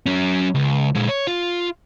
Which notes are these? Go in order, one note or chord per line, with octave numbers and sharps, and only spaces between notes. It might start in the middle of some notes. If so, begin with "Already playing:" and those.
F#3 C#4
C#2
A#2 G#3
C#5
F4